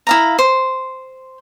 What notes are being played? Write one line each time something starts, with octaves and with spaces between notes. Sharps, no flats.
E4 F5 A#5
C5